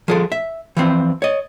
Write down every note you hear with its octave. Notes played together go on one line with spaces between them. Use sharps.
F3 G#4 A4
E5
E3 F3 C4
C#5 D#5